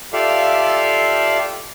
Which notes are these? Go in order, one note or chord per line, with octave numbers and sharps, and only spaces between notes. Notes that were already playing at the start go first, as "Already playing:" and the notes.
F4 G4 A4 D5 E5 F5